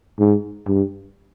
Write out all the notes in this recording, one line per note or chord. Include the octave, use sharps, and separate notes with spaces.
G#2
G2